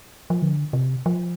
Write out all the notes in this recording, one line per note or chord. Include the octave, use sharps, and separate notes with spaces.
F3
D3
C3
F3